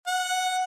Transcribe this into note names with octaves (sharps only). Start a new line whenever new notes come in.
F#5